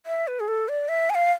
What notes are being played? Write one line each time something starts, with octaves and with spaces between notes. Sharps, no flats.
E5
B4
G#4
A4
D5
E5
G#5
F5